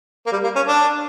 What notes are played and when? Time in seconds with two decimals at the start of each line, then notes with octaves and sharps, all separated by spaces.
0.26 A#3
0.32 G3
0.44 A#3
0.56 C#4
0.67 D4